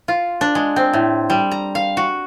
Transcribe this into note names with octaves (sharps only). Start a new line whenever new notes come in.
F4
D4
G#3
C4
A2
G3
A#5
F5
F#4